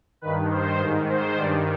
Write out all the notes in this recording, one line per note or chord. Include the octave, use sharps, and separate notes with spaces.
G2 D#3 B4
C5
G#2
D#3
C5
G2 D#3 D5